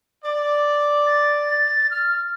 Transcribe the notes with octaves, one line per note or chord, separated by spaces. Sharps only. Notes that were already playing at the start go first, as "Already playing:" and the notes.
D5
A6
F6